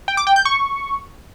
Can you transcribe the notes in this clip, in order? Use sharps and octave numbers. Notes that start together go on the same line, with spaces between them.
G5
D6
G5
G6
C#6